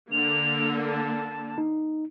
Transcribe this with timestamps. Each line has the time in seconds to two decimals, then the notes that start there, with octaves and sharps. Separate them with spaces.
0.11 D3 A#3 F7
0.87 A5
1.58 D#4